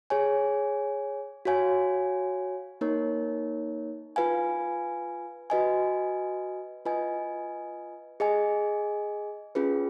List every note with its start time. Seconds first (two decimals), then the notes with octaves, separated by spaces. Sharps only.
0.10 G#4 C#5 G#5
1.45 F#4 C#5 F5 G#5
2.81 A#3 D#4 A#4 C#5
4.16 F4 B4 F5 G#5
5.50 F#4 B4 D#5 G#5
6.85 F4 B4 D#5 G#5
8.20 G#4 D#5 G#5
9.55 C#4 F4 G#4 B4